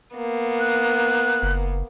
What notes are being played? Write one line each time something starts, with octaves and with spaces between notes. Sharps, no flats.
A#3 B3
F#6
F#1